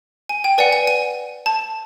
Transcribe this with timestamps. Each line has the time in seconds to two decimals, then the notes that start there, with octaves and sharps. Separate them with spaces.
0.29 G#5
0.44 G5
0.58 B4 D5 F#5 G#5
0.73 G#5
0.87 G#5
1.46 A5